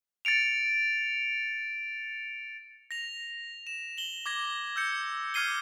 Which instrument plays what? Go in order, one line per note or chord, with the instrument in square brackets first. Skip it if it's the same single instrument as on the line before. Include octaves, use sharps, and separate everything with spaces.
[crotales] A6 C#7 D7 F7
A#6 F7
E7
F#7 G7
D6 G#6 A#6
E6 G6 C#7
D6 F6 G#6 C7 D#7 G7